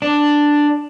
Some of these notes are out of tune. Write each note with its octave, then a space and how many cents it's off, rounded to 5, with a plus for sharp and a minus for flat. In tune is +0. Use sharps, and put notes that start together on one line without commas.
D4 +5